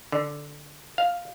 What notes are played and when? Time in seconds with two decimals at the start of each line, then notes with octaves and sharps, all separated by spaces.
0.12 D3
0.98 F5